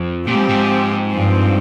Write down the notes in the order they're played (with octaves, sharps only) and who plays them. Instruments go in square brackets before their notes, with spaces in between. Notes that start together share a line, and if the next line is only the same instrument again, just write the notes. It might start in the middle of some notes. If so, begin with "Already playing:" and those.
Already playing: [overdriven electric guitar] F2
[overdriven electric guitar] A#2 [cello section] F3 C4 G4
[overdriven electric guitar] G#2
G2
G#2
[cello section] G2 F3 C4